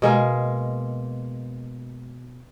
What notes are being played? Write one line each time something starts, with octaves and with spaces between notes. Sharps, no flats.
B2 G#3 A#3